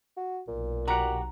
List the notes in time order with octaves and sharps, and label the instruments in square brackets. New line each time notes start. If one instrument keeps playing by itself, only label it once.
[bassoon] F#4
[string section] B1 [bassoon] A#2
[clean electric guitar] F#4 G4 F#5 [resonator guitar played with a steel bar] A#5